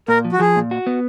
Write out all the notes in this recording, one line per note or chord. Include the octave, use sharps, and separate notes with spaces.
A#2 A#4
F3
F#4
F3 G#4
A#2
F#4
B3